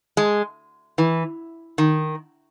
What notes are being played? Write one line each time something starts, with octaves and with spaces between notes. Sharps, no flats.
G#3
E3
D#3